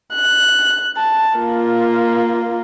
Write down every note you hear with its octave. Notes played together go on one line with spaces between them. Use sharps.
F#6
A5
A#3 F4